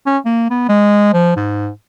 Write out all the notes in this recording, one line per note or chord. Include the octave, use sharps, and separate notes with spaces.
C#4
A#3
B3
G#3
F3
G#2